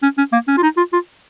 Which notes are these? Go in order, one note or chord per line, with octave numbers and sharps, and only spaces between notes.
C#4
C#4
A#3
C#4
F4
D#4
F4
F4